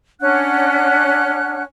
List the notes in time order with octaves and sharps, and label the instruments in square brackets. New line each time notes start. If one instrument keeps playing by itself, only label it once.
[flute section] C#4 D4 F#5 F#6